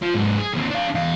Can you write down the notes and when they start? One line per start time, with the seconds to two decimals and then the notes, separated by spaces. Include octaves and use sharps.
0.02 F3
0.14 G#2 F#3
0.38 G#4
0.54 D#2 C4
0.71 D4 F5
0.95 E2 F5